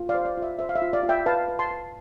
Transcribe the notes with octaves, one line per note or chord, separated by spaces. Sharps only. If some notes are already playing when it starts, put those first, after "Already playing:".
Already playing: F4
D5 F5
C5
D5
F4 E5
C5 E5
F5
E5
F4
D5 F5
F4
E5 G5
B4 F5 A5
B4
A5 C6
B4